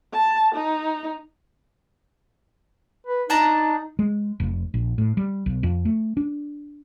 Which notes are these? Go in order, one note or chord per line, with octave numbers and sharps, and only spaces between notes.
A5
D#4
B4
D4 D#4 A5 A#5
G#3
F1
A#1
A2
G3
B1
F2
A3
D4